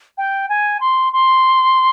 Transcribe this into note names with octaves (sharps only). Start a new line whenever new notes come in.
G5
G#5
C6
C6